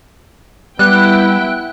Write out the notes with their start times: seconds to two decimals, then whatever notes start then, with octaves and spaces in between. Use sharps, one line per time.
0.79 G3 B3 E4 G5 F#6